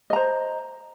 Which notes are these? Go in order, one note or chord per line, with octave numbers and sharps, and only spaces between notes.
C5 D#5 A#5